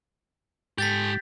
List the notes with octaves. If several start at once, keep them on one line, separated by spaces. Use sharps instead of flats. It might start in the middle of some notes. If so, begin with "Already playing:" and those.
G#2 G4 A4 G6 A6 B6